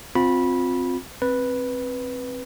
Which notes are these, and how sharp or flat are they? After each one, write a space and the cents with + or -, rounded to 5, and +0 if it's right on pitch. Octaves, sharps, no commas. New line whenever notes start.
C4 +0 F4 +30 B5 -15
C4 +15 B4 -5